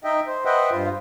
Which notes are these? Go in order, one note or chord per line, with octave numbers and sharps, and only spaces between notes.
D#4 D#5 E5 G5
C5
B4 C5 D#5 E5 F#5 G5
G2 F4 C5